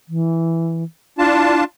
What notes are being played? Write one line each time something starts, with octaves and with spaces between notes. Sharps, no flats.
E3
D4 E4 F4 A5